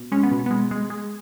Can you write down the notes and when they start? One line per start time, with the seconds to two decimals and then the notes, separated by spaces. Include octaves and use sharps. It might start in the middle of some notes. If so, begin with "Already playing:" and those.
Already playing: B2
0.12 G#3 C#4
0.23 B3
0.31 B2
0.46 G#3 B3
0.71 G#3
0.90 G#3